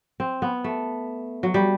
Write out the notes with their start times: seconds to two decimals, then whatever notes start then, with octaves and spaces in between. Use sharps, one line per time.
0.20 C4
0.42 B3
0.64 A3
1.43 F#3
1.54 G3